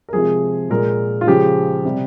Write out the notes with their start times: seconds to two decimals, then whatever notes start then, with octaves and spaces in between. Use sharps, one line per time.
0.09 A#4
0.13 C3 F3 G#3 G#4
0.70 A#2 G#3 A#4
1.21 F4
1.27 C#3 F3 G#3 G4
1.85 C3 G3